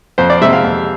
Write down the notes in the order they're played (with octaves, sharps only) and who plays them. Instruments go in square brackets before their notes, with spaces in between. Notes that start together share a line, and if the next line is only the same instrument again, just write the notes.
[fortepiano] F2 C5
D5
C3 G#3 C4 E5
F5
F2